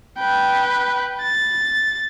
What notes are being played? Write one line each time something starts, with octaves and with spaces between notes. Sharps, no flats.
B4 G5
A6